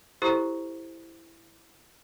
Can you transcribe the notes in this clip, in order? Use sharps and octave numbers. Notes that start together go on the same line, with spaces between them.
E4 G4 A4 C5 A#5 C#6